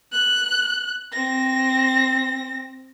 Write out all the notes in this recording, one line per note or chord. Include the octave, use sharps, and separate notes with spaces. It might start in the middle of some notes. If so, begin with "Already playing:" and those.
F#6
C4 A#6